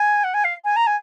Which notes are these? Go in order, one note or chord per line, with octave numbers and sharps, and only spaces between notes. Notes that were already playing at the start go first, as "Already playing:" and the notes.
Already playing: G#5
F#5
G#5
F5
G#5
A#5
G#5